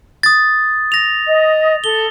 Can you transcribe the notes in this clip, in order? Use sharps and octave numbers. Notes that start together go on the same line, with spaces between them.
D#6 A6
A#6 F7
D#5
A4 G7